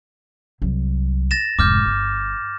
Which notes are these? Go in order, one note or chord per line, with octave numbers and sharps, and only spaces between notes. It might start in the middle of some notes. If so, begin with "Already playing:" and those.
C2 F#3
A6 A#6 E7
F1 G#2 D6 F6 G6
G1